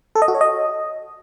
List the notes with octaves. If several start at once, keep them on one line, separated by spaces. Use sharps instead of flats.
A4
D#5
F#4
C#5
D#5